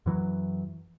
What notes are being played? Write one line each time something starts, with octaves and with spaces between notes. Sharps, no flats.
F#2 E3 F#3